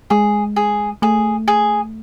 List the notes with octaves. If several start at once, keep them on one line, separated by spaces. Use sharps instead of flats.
G#3 G#4
G#4
A3 G#4
G#4